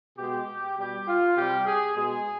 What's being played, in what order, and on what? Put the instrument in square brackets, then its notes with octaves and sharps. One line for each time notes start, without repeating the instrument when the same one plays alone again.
[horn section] B2 G#3 G4
B2 G3 G4
F4
C3 G3 G4
G#4
B2 G#3 G#4